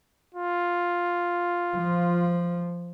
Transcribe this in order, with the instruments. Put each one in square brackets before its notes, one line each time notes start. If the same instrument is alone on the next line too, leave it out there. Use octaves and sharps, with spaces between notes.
[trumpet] F4
[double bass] F3